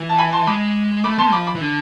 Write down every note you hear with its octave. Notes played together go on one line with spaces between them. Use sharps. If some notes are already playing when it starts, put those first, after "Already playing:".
Already playing: E3
A5
G#5 B5
A5 C6
G#3 B5 D6
A3 B5 D6
B3 A5 C6
F3 B5 D6
B5 D6
E3
D3